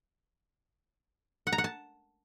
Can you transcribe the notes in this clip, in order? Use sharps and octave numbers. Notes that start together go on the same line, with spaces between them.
F#5
A#5
F#5
A5